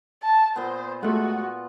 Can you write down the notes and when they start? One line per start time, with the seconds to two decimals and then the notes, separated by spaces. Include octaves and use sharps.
0.23 A5
0.56 A#2 B3 C5
1.03 G#3 A3 F4 F#4 F#5